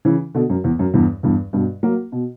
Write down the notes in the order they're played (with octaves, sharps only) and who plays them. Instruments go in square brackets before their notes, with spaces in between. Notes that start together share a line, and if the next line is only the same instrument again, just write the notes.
[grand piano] C#3 E3
B2 D3
F#2
E2
F#2
E2 G2
E2 G2
G2 B2
F#3 A#3
B2